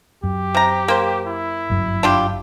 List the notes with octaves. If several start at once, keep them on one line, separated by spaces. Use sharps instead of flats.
F#2 G4
C3 A#5
A#3 C5
E4
G1 F#2
D4 F4 G4